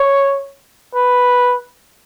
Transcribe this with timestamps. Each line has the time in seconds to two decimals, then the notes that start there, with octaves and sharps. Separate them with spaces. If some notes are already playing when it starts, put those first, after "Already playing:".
Already playing: C#5
0.95 B4